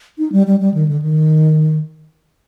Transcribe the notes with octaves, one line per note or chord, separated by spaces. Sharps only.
D#4
G3
G3
G3
D#3
D3
D#3